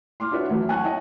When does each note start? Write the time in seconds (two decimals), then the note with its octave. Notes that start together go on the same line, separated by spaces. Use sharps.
0.20 C6 D6 F6
0.31 D4 F4 F#4 B4 C#5 E5
0.50 A1 E3 F#3 A3
0.69 F#5 G#5 A5 C#6 F#6
0.84 C#5 D#5 G5 A5